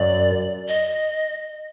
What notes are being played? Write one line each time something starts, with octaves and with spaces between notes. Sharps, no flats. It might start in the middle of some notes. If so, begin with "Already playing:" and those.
Already playing: F#2 D5
D#5